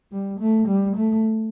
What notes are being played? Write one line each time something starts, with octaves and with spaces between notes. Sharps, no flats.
G3
A3
G3
A3